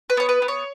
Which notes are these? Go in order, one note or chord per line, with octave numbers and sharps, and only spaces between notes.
B4
B3 C#5
B4
B3
C#5